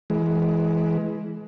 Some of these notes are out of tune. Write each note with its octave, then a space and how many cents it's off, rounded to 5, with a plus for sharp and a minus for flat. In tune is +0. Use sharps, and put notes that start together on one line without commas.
E3 +0 G#3 +25